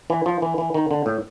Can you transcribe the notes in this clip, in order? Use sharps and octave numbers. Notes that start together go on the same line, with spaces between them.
E3
F3
E3
E3
D#3
D3
A2